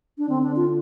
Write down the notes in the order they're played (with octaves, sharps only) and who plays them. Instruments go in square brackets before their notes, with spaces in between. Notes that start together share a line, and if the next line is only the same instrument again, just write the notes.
[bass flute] D4
[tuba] D3 [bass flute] C4
[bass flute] D4
F4